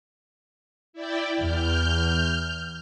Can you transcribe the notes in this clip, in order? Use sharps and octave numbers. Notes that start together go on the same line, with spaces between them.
E4 D5 G5
E2 F6 G6